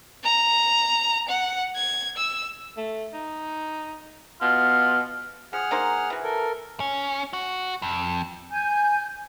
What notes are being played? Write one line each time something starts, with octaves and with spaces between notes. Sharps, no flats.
A#5
F#5
G#6
E6
A3
D#4
B2 F4
F3 G#4 F#5 F6
A#3 D#4 C5
E3 F#4
A4 A#4
C#4
F#4
F2
G#5 G6